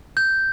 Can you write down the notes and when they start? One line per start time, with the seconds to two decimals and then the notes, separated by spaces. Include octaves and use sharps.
0.17 G6